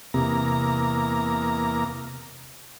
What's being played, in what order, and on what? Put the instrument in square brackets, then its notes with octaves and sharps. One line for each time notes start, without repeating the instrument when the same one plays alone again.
[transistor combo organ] E2 A#3 A#5 [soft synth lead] C3